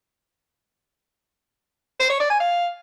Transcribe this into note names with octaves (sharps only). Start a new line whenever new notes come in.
C5
C#5
D5
G#5
F5